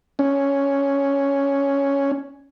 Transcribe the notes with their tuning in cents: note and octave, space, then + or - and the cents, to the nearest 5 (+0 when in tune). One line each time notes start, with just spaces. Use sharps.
C#4 +5